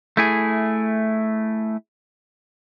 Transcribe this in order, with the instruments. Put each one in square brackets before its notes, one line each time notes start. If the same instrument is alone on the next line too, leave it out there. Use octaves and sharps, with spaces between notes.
[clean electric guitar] A3 E4 G#4